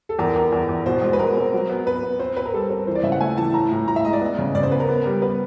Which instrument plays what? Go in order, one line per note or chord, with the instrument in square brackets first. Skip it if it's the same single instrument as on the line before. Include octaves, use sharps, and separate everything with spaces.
[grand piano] A4
[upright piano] E2 [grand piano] A#4
[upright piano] E2 [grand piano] A#4
[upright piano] E2
E2
[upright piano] B2 [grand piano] C5
[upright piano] G#3
[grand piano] B4
[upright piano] G#3 [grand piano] A#4
[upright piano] C4
F#3
B3
[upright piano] B3 [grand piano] B4
[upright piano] B3
[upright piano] C4 [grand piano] C5
[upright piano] C4 [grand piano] B4
[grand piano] A#4
[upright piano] G3 [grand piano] A4
[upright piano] C4 [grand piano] A#4
[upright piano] E3 [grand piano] C5
[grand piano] D5
[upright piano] C#3 [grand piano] E5
[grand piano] F#5
[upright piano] A3 [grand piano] G#5
[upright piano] E3 [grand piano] A5
[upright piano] A2 [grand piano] A#5
[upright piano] A2
[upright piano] A2 [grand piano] A#5
[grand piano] E5
[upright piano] G#3 [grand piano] D#5
[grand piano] D5
[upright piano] B3
C#3
[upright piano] C#3 [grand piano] D5
[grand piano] C5
[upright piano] B3 [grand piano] B4
[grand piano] A#4
[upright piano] B3
G3
[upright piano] B3 [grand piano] B4